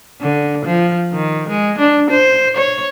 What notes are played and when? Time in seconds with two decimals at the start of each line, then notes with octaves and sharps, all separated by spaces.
0.21 D3
0.65 F3
1.13 D#3
1.49 G#3
1.79 D4
2.11 C5
2.57 C#5